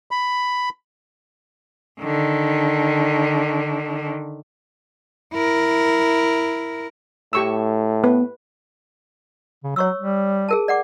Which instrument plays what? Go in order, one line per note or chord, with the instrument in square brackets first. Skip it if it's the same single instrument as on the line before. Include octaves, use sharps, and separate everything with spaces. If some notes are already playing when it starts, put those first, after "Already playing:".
[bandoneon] B5
[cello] D3 D#3
E4 A#4
[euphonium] A2 [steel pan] G4 C#6 E6
[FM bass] B3 [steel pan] B4
[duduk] C#3
[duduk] F#3 [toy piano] C#5 C#6 E6
[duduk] G3
[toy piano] G#4 A#4 A5
D5 F#5 D6